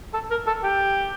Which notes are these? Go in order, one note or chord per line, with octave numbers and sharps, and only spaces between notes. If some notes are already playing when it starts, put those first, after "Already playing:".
A4
A#4
A4
G4